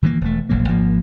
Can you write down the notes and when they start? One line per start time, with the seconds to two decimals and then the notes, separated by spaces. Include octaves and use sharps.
0.02 D#3 E3 G3 A#3
0.21 E1 A3
0.49 D#1 A#1 F#3 A#3
0.68 G#1 F3 A#3